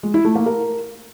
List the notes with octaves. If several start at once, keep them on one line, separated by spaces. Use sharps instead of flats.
G#3
E4
A3
A#3
A#4